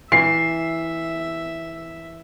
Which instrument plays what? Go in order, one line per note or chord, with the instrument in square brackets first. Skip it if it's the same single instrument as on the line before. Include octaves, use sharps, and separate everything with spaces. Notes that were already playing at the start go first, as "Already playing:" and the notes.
[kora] E3 [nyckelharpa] E5 [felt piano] C7